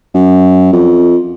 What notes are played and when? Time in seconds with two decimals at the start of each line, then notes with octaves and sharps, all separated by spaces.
0.15 F#2
0.73 F2